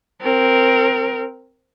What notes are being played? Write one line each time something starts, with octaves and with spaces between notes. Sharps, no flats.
C4 A#4